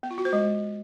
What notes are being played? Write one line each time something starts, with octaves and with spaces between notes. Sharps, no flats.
B3
F4
F#4
C5
G#3